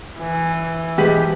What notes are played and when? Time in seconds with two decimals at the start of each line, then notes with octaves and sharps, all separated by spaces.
0.17 E3
0.98 E2 G#2 B2 G4 G#4 B4